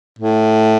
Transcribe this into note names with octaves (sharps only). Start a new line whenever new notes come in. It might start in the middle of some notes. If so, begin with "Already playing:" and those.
A2